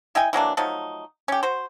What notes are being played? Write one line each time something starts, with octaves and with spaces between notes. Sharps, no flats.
E4 D#5 G5 G#5
E3 F#3 A#3 D4
F3 F#3 A3 D#4
C#4 G4
F#4 C5